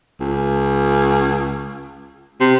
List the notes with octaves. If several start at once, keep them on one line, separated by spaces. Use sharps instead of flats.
C#2
C3